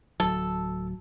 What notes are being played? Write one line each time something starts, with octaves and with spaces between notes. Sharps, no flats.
D1 F#3 A4